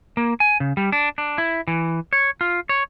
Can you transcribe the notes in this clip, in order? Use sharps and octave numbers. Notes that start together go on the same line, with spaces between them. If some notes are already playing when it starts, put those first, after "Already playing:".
A#3
G#5
C#3
G3
D4
D4
E4
E3
C#5
F4
C#5